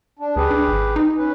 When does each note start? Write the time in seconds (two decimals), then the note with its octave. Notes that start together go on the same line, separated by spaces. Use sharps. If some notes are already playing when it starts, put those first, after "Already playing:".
0.19 D4
0.36 D2 G4 G#4 B4
0.51 D4
0.68 G#1
0.96 D#4
1.17 C#4 B4